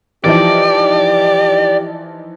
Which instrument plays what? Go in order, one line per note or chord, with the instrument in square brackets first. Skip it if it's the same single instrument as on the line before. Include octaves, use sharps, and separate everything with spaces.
[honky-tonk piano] E3 F3 D#4 [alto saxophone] G4 [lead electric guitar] D5